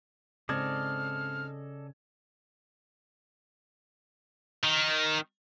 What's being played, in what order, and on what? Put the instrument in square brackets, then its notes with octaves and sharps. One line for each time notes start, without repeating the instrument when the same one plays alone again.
[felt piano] G#2 C4 G#6 [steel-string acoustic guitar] C#3 [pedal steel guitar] A4 D5 D#5 [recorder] F6
[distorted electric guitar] D#3